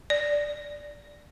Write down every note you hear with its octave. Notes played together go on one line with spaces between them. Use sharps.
D5